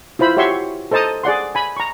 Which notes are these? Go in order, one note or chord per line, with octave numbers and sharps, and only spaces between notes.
E4 F4 C5 B5
F#4 G4 C#5 E5 C6 C#6
A4 C5 D#5 A5 A#5 D#6
G#4 D5 F#5 C6
G#5 B5
A#5 C#6